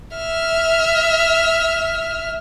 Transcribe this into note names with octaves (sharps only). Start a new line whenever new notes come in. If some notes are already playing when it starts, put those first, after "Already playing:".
E5 F6